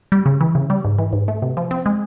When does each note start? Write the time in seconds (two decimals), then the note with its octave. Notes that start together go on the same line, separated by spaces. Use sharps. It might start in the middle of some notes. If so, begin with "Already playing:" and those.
0.12 G3
0.26 C#3
0.41 E3
0.55 C#3
0.70 G3
0.85 G#2
0.98 E3
1.13 G#2
1.28 A3
1.42 C3
1.57 F3
1.71 C4
1.86 G#3